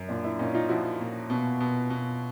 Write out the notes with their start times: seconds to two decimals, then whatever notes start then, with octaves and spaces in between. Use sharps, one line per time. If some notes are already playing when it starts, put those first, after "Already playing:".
Already playing: F#2
0.09 A#2 D4
0.24 D4 E4
0.39 A#2 C#4 D#4
0.54 D#4 F4
0.69 F3 E4 F#4
1.00 A#2
1.30 B2
1.60 B2
1.90 B2